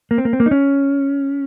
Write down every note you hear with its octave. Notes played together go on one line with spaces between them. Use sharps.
A#3
C4
A#3
C4
A#3
D#4
C#4